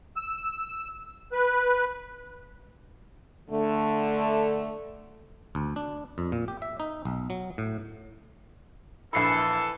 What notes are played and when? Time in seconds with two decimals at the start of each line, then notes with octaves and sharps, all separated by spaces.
0.16 E6
1.32 B4
3.50 D3 A3
5.55 D2
5.76 D4
6.18 F2
6.32 A#2
6.48 G4
6.62 E5
6.80 D#4
7.05 B1
7.30 F#3
7.58 A2
9.13 A#1 E3 E4 A4 B5 C7